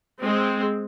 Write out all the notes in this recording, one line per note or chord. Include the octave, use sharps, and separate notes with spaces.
G#3 C4